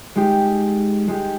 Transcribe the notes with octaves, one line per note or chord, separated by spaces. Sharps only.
G#3 D#4 G4
G#3 D#4 G4